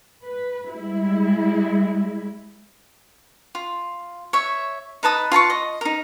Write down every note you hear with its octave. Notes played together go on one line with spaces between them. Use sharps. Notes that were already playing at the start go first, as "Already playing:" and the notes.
B4
G3 G#3 E4
F4
C#5 E5
D#4 B4 A5 D#6
F4 A5 A#5 C#6
D#5
D#4 A#4